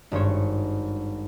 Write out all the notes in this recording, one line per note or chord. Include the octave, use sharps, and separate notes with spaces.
G#1 G2 C5 C#5